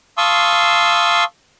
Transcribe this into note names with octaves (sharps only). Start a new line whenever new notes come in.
F5 A5 C6 C#6 D#6 E6